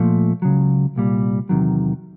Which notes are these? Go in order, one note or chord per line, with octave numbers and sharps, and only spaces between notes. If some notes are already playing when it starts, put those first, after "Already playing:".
Already playing: A#2 F3 A3
C#2 C#3 F#3
C2 A#2 G3
E2 C3 D#3 F#3